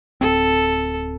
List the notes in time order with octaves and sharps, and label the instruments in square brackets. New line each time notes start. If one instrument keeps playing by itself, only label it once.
[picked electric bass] D1 G1 C4 [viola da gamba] A4